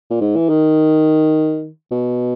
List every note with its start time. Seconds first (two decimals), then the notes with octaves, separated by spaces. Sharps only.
0.10 A#2
0.21 G#2
0.36 E3
0.49 D#3
1.91 B2